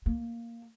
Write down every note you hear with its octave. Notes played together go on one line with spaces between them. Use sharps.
A#3